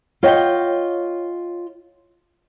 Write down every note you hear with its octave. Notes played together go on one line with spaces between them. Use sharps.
F4 C#5 D#5 F#5 G5